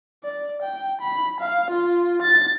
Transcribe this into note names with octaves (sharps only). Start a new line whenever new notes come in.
D5
G5
B5
F5
F4
A6